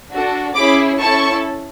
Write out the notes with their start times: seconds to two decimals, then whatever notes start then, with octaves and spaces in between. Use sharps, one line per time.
0.11 D4 F#4 A4
0.55 C#4 E4 G#4 B5 D6
1.00 C#4 E4 A4 A5 C#6